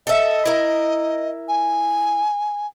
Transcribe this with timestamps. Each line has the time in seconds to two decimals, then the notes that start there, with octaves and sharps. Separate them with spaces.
0.07 A4 D#5 E5
0.46 E4 A#4
1.48 G#5